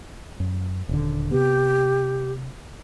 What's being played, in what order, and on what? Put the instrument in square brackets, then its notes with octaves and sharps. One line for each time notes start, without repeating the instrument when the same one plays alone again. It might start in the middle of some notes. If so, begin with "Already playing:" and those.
[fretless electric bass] F#2
D#1 D3
[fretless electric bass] C3 B3 [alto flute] G4